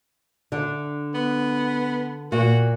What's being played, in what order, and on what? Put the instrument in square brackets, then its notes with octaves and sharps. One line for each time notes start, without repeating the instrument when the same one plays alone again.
[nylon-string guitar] D3 D4
[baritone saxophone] B3
[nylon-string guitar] A#2 [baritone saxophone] F#4